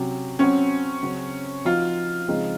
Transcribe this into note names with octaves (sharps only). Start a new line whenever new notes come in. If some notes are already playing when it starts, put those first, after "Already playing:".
Already playing: C3 F#3 C#4 F#4
F#3 C4 C#4 F#4
C#3 F#3 C4 F#4
F3 C4 D#4 F4 F#4
C#3 F3 G#3 C4 D#4